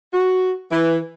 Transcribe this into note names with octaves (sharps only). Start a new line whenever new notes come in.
F#4
E3